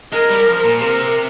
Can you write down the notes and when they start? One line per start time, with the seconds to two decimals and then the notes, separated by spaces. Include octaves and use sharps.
0.13 G#3 A#4
0.30 G3
0.47 F3
0.64 A#2
0.80 C3 A#4